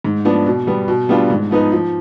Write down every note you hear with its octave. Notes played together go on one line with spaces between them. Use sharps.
G#2
F3 B3 D4
B2
G3 B3
B2
G3 B3 D4 F4
G#2
F3 B3 D#4 B4
F3